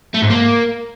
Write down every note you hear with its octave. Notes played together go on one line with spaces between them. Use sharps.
A3
G#2
A#3